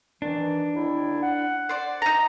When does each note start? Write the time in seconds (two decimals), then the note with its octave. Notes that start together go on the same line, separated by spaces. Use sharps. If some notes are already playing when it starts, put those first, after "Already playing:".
0.22 D#3 E3 D4
0.75 D#2 E4
1.22 F#5
1.69 C5 D5
2.02 D#4 A#5